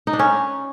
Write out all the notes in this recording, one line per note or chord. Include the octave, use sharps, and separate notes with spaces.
D#4
D4
C#4